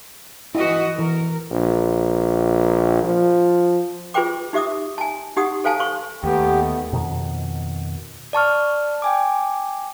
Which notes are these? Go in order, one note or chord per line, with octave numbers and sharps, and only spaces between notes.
E3 E4 F#4 D#5
E3 A#4
A#1
F3
F4 G#4 B4 C5 G5 D6
D#4 G4 E5 D6 D#6
G#5 A5
D#4 G4 F#5 D#6
A4 C5 F5 G#5 A5
C5 C#6
D#2 A3 B3 G4
F2 B2 D#3
D5 A5 C#6 F6
G5 G#5 D6